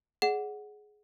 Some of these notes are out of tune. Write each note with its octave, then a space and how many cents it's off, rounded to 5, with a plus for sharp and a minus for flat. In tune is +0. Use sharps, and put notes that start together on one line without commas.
G#4 +15 D5 +0 F#5 +0